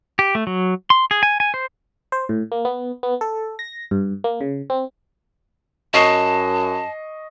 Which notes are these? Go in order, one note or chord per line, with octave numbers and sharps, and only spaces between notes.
G4
A3
F#3
C6
G#4
G#5
G#5
C5
C5
A2
A#3
B3
B3
A4
A#6
G2
A#3
C#3
C4
F#2 D#5 A5 C#6 C7